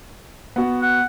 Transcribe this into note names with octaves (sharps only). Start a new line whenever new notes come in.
B3 F#4
F#5